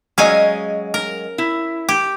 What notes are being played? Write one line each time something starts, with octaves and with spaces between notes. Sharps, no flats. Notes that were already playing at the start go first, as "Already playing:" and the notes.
F#3 G#3 C#4 D#5 F5 G#5
A#4
E4
G4